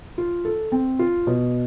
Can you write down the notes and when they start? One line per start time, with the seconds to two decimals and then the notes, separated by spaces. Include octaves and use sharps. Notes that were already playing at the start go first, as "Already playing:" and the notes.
0.18 F4
0.45 A4
0.72 C4
0.99 F4
1.27 B2